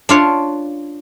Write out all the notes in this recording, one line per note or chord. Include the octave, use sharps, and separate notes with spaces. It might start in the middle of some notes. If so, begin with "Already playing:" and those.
D4 F4 C#5